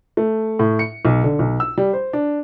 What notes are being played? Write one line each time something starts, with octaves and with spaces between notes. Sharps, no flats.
A3
A2
C#7
B1
D3
B1
E6
G3
C5
D4